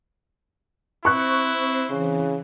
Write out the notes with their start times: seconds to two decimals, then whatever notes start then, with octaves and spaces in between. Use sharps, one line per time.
1.05 C4 E4 C5 C#6 F#6
1.91 C#3 E3